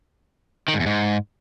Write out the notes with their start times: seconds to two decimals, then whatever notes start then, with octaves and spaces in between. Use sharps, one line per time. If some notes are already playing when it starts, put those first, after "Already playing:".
0.68 D#3
0.74 G#2
0.80 E2
0.86 G#2